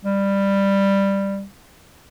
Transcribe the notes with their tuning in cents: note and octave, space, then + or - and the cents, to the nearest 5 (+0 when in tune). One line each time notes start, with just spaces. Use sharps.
G3 +10